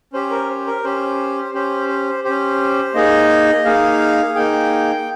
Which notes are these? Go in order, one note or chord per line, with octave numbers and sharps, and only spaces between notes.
C#4 G4 C5
A#4
C5
A#4
C#4 G4 C5
C#4 G4 C5
C5
C#4 G4 C5
A#3 D#4 G#4 D#5
A#3 D#4 G#4 F5
A#3 D#4 G#4 G5